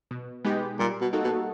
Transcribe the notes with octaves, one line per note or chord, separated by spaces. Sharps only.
B2
G#3 B3 D#4 G4
A#2 G3
B2
A#3 D#4 F#4 A4
B2